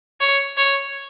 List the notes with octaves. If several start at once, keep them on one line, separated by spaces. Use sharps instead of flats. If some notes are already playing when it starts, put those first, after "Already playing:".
C#5
C#5